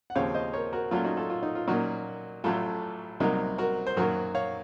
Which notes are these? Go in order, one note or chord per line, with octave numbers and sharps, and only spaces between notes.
F#5
D#2 C#3 F3 C4 C#5 F5
C5 D#5
A#4 C#5
F#4 A#4
A#2 F#3 A3 C#4 F4
D#4 F#4
F4 A4
F4
D#4
F4
A#2 F#3 A#3 C#4 D#4 F#4
A1 A2 F#3 A3 F4 A4
C2 C3 F#3 A#3 D#4
F#4 A#4
C5
F#2 D#3 F#3 A#3 F#4 A#4
C#5 F5